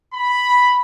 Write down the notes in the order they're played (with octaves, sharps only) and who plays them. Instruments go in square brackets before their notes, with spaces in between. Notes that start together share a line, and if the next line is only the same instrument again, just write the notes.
[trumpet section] B5